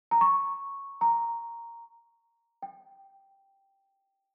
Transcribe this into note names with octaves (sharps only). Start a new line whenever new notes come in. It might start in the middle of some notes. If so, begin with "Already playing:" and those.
A#5
C#6
A#5
G5